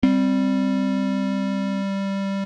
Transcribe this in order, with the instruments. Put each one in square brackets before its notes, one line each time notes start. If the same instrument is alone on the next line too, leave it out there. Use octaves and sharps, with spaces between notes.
[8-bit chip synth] G3 [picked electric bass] C4